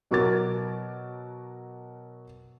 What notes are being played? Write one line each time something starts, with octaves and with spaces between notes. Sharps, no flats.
B2 F#3 F#4 A#4 D6 A6